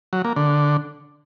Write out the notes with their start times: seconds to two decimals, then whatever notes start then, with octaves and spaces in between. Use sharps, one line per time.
0.13 F#3
0.25 A#3
0.36 D3